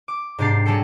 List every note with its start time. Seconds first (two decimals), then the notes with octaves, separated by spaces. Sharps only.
0.08 D6
0.38 G#2 C3 D4 G4 A6 C7
0.66 F#3 G3 G#4 A4 C#7